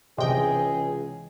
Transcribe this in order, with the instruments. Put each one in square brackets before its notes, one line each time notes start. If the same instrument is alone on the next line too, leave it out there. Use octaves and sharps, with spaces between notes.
[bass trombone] C#2 [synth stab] C3 G5 [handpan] E3 D#5 [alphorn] G#4